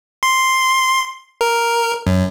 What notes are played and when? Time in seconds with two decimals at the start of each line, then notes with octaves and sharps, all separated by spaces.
0.23 C6
1.41 A#4
2.07 F#2